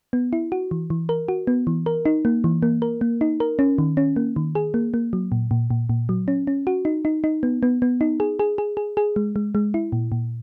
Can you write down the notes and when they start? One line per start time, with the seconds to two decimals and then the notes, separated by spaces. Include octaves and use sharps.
0.13 B3
0.33 E4
0.52 F#4
0.71 E3
0.90 E3
1.09 A#4
1.28 F#4
1.47 B3
1.67 E3
1.86 A#4
2.06 D#4
2.25 A#3
2.44 E3
2.63 A#3
2.82 A#4
3.01 A#3
3.21 D#4
3.40 A#4
3.59 C#4
3.78 D#3
3.97 C#4
4.16 A#3
4.36 D#3
4.55 G#4
4.74 A#3
4.94 A#3
5.13 F#3
5.32 A#2
5.51 A#2
5.71 A#2
5.89 A#2
6.09 F#3
6.28 C#4
6.47 C#4
6.67 F#4
6.85 D#4
7.05 D#4
7.24 D#4
7.43 B3
7.63 B3
7.82 B3
8.01 D#4
8.20 G#4
8.39 G#4
8.58 G#4
8.77 G#4
8.97 G#4
9.16 G#3
9.36 G#3
9.55 G#3
9.74 E4
9.92 A#2
10.12 A#2